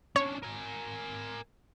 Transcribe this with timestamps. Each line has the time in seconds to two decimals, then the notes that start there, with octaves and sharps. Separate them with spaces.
0.16 C#4 D4 C#5
0.43 A#4 G#5